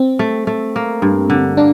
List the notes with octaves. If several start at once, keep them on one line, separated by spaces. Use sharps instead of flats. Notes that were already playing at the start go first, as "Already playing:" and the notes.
Already playing: C4
A3
A3
A#3
G2
D3
A#3 D4